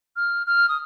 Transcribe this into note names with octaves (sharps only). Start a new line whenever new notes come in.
F6
F6
D#6